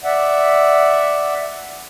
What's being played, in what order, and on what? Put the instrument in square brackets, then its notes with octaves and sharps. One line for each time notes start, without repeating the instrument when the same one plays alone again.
[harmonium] D5 E5 F#5